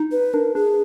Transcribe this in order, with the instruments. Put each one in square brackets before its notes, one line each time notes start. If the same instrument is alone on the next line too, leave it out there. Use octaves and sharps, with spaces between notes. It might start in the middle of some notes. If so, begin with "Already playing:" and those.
Already playing: [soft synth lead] D#4
[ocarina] B4
[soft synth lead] D4 [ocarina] A#4
[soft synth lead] D4 [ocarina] G#4